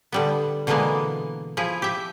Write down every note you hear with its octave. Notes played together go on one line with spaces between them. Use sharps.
D3 G3 B3
B2 D3 E3 G#3 A#3 B3
F3 E4 G#4
G4 E5